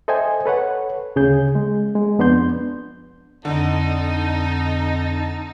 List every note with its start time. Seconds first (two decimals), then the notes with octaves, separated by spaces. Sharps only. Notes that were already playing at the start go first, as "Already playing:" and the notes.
0.08 A4 C5 D#5 E5 G5 G#5
0.46 A4 B4 C#5 F#5
1.16 D2 C#3 G#4 G6
1.55 G#3
1.95 G#3
2.19 F2 B3 D4 C6 G6
3.45 F2 D3 D#4 A5